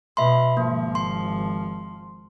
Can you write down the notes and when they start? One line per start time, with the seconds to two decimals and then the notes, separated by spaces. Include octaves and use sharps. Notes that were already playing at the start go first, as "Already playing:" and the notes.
0.17 B2 E5 B5 C6
0.57 G#1 F3 A#3
0.95 C6